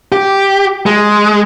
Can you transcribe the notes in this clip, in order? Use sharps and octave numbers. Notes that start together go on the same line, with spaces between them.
G4
G#3